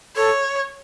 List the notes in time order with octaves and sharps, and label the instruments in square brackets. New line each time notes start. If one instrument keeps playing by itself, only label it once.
[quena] A4 [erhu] C#5